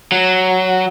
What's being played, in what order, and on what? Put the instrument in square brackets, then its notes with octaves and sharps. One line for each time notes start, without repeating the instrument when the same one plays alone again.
[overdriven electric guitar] F#3